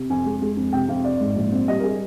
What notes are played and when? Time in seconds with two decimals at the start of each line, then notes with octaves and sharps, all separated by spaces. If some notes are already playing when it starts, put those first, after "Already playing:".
Already playing: C3
0.10 F2 G#5
0.26 G#3
0.42 G#3
0.57 F2
0.73 C3 G5
0.88 F2 F5
1.04 C4 D5
1.21 G#2
1.36 A#1
1.52 C4
1.68 G3 D#5
1.79 A#4
1.83 G#4